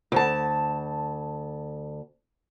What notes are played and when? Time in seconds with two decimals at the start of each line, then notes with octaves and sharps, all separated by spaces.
0.12 D2 A5